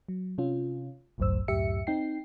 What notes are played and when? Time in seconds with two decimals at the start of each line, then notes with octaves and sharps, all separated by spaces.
0.09 F#3
0.38 C3 C#4 F4
1.18 G1 C2 F#2 A2 C5 E6
1.48 C#2 F#2 A2 G4 E5 C#7
1.87 C4 D#4 G5 C7